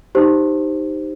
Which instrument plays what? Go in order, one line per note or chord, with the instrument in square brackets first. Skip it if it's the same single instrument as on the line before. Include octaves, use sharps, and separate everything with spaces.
[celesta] D#4 G4 C5